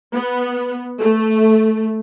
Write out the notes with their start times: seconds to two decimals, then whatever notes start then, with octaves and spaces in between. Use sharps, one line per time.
0.14 B3
1.00 A3